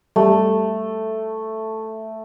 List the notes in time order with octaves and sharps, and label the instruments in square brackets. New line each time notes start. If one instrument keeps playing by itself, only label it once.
[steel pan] G3 [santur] A3